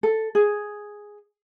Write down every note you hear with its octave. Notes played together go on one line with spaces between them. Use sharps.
A4
G#4